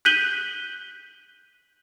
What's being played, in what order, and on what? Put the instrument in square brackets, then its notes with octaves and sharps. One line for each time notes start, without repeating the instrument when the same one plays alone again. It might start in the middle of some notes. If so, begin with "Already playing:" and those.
[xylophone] F#6 G6 B6 D#7 F#7 G7